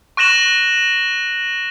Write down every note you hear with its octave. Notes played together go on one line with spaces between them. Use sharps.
C#6 F#6 A#6 E7 F#7